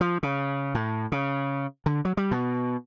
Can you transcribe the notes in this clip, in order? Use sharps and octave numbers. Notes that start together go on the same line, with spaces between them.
F3
C#3
A2
C#3
D3
F#3
G3
B2